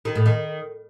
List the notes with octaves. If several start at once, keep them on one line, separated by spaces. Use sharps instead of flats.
D#3
A2
D#3